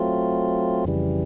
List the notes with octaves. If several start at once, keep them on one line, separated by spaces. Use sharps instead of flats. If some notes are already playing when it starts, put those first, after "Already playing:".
Already playing: F#3 A3 C4 F4
F2 C#3 E3 G3